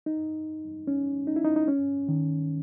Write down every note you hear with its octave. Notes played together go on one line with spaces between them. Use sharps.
D#4
C#4
D#4
E4
D#4
D#4
C#4
D#3